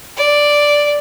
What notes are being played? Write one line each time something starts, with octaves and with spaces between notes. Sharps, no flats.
D5